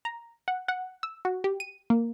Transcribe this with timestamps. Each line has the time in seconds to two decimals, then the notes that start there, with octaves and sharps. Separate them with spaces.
0.05 A#5
0.48 F#5
0.68 F#5
1.03 E6
1.25 F#4
1.44 G4
1.60 D#7
1.90 A#3